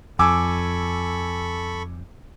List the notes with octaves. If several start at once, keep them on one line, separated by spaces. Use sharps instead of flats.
F2 A4 G#5 B5 C#6 D6 E6